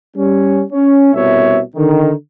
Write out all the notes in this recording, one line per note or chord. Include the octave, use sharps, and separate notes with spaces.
G3 C#4
C#4
C2 B2 C#5 E5
D3 D#3